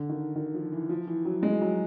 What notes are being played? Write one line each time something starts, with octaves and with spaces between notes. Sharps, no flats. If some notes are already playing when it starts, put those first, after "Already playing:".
Already playing: D3
D#3
D#3
F3
E3
F3
E3
F#3
G#3
F#3